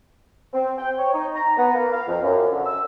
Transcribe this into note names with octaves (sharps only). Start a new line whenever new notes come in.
C4
G5
C#5
D#4
A#5
B3
A#3
F5
F2
F#2
D3
E6